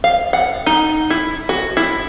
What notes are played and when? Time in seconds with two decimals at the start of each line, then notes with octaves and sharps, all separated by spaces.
0.04 F5
0.33 F#5
0.66 D#4
1.10 E4
1.49 F#4
1.77 E4